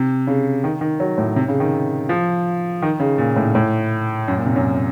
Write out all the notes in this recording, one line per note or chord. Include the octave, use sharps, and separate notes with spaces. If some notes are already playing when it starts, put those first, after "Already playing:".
Already playing: C3
C#3
D#3
D#3
F#3
A2
C3
C#3
D#3
F3
D#3
C#3
A#2
A2
A2
F#2
A#2
C3
F#2